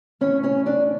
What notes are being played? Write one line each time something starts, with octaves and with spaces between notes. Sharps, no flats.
A2 E3 C#4 C#5
C#4 C#5
D4 D5